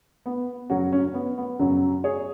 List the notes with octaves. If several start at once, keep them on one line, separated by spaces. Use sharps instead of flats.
B3
F#2 C#3 F#3 C#4 F#4
C#4
C#4
B3
B3
F#2 C#3 F#3
G#4 C#5